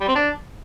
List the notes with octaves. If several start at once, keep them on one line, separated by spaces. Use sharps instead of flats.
G3
C4
D4